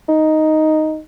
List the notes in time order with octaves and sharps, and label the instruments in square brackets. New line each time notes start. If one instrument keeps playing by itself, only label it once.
[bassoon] D#4